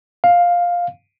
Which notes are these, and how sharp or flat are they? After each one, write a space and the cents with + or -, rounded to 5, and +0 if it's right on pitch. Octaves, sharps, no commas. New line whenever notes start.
F5 +5